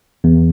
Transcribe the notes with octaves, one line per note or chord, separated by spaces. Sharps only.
E2